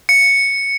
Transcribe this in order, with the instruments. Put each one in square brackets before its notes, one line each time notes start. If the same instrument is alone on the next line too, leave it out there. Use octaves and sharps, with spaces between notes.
[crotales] C#7